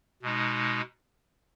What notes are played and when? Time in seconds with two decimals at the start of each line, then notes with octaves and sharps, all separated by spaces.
0.22 B2 G#3 D#4